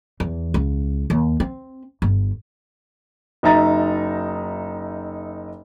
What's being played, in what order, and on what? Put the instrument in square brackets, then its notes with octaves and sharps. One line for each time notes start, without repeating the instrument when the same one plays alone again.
[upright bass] E2
C#2
D#2
C4
G1
[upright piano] F#1 D#4 E5 A#5 A6